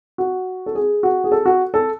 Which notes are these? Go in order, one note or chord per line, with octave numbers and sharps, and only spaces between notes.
F#4
A4
G#4
F#4
G#4
A4
F#4
A4